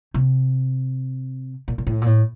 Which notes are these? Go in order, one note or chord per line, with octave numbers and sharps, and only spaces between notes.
C3
A#2
A#2
A2
A#2
A2